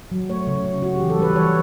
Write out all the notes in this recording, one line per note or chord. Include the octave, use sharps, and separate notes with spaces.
F#3
A3 C#5
C#3
C#3
C#3 F#4
E3 G4
A4
G3 B4
E3 C#5